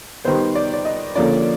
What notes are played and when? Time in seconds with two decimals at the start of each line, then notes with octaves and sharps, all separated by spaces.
0.25 D#3 G3 B3 C5
0.55 D5
0.74 D5
0.85 D#5
1.15 D3 F3 A#3 C#4 D5